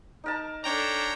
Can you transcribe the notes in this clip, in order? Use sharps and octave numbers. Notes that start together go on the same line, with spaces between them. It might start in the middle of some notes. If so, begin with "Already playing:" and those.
D#4 A#4 A5
D4 A4 C#5 G5 A#5